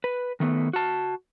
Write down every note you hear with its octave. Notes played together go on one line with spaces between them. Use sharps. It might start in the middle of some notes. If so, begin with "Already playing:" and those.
B4
D#3 A3 B3
F#4 A5